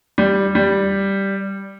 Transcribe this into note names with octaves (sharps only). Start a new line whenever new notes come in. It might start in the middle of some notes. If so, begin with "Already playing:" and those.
G3
G3